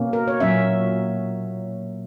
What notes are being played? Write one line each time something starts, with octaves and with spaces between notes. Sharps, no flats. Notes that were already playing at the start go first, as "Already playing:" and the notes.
Already playing: B2 A#3 C#4
A#4
C#5
A#2 F#3 C#4 E5